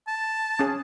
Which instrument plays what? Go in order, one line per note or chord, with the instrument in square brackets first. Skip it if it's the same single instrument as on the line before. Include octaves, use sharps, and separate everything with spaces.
[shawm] A5
[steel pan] C#4 G#4